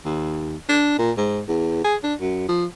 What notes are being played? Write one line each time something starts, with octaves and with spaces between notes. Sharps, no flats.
D#2
D4
A#2
G#2
E2
G#4
D4
F#2
F3